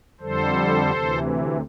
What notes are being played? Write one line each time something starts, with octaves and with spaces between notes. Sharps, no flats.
F2 D3 G3 A4 C5
D2 C3 E3